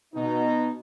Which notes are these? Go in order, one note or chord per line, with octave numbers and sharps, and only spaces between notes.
B2 D#4